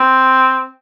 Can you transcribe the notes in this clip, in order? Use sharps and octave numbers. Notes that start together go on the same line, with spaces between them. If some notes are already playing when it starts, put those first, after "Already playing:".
Already playing: C4